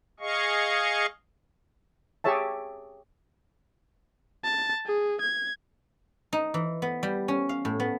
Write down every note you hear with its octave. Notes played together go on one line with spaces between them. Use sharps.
G#4 D#5 F5 C#6
G4 G#4 C#5 E5 A5
A5
G#4
G#6
D#4
E3
B3
G3
C#4
F5
A2
B3